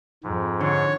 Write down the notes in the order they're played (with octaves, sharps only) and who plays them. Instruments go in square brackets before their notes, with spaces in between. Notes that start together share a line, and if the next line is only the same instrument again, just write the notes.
[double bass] F2 [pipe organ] G#2
[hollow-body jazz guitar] D3 [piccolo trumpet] C#5